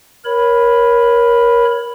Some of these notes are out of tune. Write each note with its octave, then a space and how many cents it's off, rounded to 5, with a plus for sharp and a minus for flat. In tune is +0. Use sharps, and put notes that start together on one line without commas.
A#4 +20 C#5 +0 B5 +0